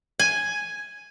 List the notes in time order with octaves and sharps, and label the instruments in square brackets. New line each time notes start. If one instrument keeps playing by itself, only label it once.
[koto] G#5